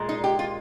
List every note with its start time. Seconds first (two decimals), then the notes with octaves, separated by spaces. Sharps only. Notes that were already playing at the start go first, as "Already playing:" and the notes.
Already playing: A#2 G#3
0.09 D#4
0.24 G4
0.39 F4